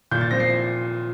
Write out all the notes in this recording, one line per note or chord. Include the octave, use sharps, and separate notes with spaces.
A#2 G6
A6
F3 C4 A#6
C7